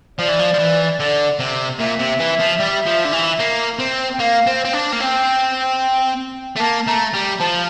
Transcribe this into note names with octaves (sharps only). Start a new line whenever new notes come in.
F3 D5
E3
F3
F3
E3
D3
C3
A#2 E5
C3
E3
F3
G3
F3
D3
E3
A#3
C4
G5
A#3 F5
C4
C4
D4
A#3
C4 G5
A3
A#3 A5
A3 A#5
G3
F3 A5